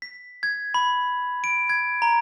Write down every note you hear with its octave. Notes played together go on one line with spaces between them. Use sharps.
B6
G#6
B5
D7
G#6
A#5